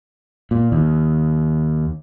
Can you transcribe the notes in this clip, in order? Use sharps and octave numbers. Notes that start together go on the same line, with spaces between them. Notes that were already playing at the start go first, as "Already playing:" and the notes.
A#2
D#2